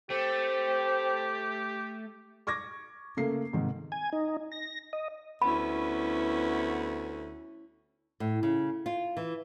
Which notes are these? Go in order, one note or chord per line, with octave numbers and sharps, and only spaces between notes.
A3 C4 G4
C#6 D6 G#6 A#6
C#3 A3 A#3 C7
G#2 C3 D#3
G#5
D#4
A#6
D#5
D2 B3 C#4 E4 B5
A2
C#3
F4
E3